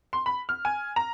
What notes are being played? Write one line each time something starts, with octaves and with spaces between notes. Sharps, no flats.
C6
B5
F6
G#5
A#5